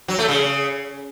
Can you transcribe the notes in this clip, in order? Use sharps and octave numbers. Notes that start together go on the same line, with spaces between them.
F#3
A3
C#3